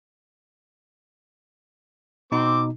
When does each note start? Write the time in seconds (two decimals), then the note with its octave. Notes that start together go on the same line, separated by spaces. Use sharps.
2.32 B2 C4 D#4 D6